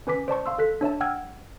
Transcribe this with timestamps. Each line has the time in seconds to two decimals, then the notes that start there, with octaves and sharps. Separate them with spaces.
0.07 C#4 B4 G#5 D6 B6
0.28 C5 D5 A5 C#6
0.46 F5 C6 E6
0.58 A4 F#6 B6
0.81 D4 C#5 E5 A5
1.01 F#5 G5 E6 F6 G#6